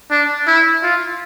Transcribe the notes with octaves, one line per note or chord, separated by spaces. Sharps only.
D4
E4
F4